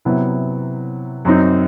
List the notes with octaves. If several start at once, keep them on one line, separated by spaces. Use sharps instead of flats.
C3 F#3 B3 E4
F#2 F#3 C4 D#4